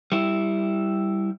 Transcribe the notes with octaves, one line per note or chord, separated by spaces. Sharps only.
G3 E4